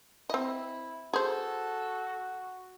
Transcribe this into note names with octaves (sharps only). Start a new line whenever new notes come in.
C4 E4 D#5
F#4 G#4 A4 C5